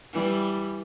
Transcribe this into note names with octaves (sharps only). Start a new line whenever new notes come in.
E3 G3